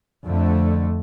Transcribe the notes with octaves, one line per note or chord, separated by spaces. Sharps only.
F2 D3 A3